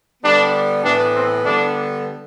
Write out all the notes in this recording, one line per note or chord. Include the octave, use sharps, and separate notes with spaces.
D3 G3 B3 D4
A2 E3 B3 D4
C4
D3 G3 B3 D4